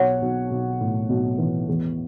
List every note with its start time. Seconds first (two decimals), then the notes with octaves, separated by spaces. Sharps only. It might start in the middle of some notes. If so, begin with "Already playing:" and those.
Already playing: B1 C#5 F#5
0.21 B1
0.51 B1
0.80 A2
1.09 B1
1.38 E3
1.68 E2